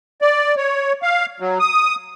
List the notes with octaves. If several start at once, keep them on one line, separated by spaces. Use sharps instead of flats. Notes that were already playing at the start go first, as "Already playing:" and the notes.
D5
C#5
F5
F#3
D#6